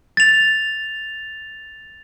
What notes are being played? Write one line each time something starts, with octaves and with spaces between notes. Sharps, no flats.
A6 F7